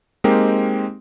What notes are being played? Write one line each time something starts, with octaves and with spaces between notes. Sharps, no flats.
G#3 A#3 C4 D#4 G4 A#4